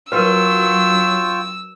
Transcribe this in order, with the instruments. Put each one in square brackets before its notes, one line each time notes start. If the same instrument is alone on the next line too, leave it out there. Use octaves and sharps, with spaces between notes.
[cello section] F#3 [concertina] F4 G5 C#6 [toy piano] A#4 B4 [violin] E6